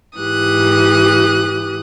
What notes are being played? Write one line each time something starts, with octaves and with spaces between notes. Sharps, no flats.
G#2 E3 G4 D#6 F#6